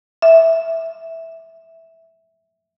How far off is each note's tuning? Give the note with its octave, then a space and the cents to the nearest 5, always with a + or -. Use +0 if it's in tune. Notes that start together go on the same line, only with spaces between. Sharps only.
E5 -10